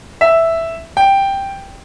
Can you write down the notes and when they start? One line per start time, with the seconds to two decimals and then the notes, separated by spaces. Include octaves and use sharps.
0.21 E5
0.97 G5